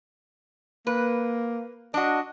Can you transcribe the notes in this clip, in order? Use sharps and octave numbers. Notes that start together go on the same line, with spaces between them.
A#3 B4
D4 F#4 D#5